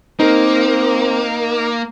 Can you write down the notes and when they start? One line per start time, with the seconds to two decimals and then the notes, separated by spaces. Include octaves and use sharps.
0.20 A#3 C4 D#4 A#4